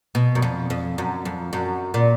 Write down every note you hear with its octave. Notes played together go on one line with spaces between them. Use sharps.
B2
F#2
F2
F2
F#2
F2
F#2
A#2